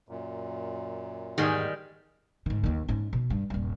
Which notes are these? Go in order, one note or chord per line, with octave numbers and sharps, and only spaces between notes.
F#2 A#2
E2 G#2 D#3 G3 G#3 G#4
G#2 D#3
D#2 D#3
G#2 C#4
B2
G2
D#1 G2